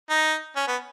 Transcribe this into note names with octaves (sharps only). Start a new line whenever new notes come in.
D#4
C#4
B3